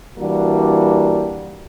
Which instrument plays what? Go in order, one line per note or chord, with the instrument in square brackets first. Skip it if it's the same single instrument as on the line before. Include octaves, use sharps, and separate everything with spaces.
[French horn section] E3 G3 A#3 D4 F#4